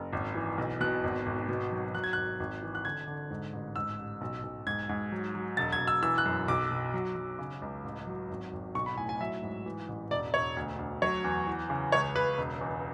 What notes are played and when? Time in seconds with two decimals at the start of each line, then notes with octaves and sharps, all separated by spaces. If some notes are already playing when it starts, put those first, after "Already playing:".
Already playing: F#1
0.13 G#1
0.35 E3
0.58 B1
0.81 B2 F#6
1.04 G#1
1.26 G#1
1.49 B2
1.71 F#3
1.94 F#3 F#6
2.04 G#6
2.13 G#1 F#6
2.40 G#1
2.63 E3
2.75 F#6
2.85 D3 G#6
3.07 D3
3.31 G#2
3.53 A1
3.76 G#2 E6
3.99 A1
4.21 B1
4.43 B1
4.67 G#2 G#6
4.89 G#2
5.12 F#3
5.35 F#3
5.57 E1 A6
5.72 G#6
5.80 E1
5.87 E6
6.03 E3 E6
6.18 F#6
6.26 F#2
6.48 B1 D6
6.71 B2
6.94 F#3
7.16 F#3
7.39 C#3
7.62 C#2
7.84 A1
8.07 F#3
8.30 G#1
8.53 G#1
8.75 B1 C#6
8.86 B5
8.98 A2 G#5
9.09 G#5
9.21 F#3 E5
9.43 G#2
9.66 E3
9.88 A1
10.11 E1 D5
10.33 E1 C#5
10.57 D2
10.79 D2
11.02 F#3 C#5
11.24 E2
11.47 E3
11.70 C#3
11.92 C#2 C#5
12.15 C#2 B4
12.38 E1
12.61 E2